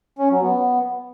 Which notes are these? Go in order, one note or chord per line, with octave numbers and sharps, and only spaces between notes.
C#4
F#3
B3